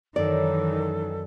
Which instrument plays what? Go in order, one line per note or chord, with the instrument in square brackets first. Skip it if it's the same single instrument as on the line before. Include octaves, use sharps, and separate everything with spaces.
[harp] F#2 [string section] D#3 E3 [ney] A4 [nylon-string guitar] D5